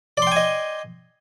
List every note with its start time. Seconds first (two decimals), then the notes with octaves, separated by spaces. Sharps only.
0.17 D5
0.22 C6
0.27 G5
0.32 G#5
0.36 D#5